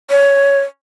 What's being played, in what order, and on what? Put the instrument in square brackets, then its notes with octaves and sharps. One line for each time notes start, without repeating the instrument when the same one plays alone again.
[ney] C#5